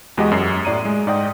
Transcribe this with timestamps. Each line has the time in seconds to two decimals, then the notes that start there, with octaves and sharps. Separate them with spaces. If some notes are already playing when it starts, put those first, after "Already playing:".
0.18 E2 G#3 F#4 G4 D#5
0.31 F#2 C7
0.65 A2 D5 A#5 D#7
0.85 G#3
1.07 G#2 D5 D#5 G5 D#6